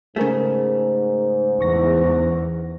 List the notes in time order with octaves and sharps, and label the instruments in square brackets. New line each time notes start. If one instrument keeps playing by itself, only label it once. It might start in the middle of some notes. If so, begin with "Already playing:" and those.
[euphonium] G#2 [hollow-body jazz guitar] C#3 A3 [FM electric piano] G#3 G#4 A#4
[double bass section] E2 [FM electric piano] C#6 A#6